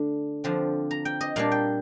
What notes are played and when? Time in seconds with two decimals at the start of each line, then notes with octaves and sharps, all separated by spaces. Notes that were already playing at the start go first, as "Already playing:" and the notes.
Already playing: D3 A3 D4
0.44 D3 F3 C4
0.91 A#5
1.05 G5
1.21 D#5
1.36 A#2 G3 A#3 D4 F5
1.52 G5